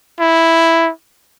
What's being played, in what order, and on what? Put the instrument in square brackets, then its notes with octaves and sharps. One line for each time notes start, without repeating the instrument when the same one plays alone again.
[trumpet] E4